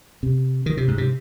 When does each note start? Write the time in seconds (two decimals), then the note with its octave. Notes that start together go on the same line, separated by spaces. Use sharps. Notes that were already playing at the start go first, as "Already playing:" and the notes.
0.23 C3
0.66 D#3
0.77 C3
0.88 G#2
0.98 C3